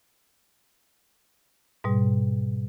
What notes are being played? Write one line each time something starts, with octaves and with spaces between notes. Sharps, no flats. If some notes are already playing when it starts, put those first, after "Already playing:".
G#2 B2 G3